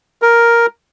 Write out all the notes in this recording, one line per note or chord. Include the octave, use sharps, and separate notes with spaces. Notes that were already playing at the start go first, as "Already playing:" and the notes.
A#4